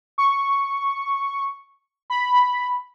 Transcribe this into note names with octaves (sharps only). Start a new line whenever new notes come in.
C#6
B5